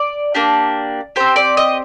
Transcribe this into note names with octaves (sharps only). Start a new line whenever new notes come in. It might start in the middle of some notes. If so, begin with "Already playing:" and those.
Already playing: D5
A#3 D4 G4
C4 G4 C5
D5
D#5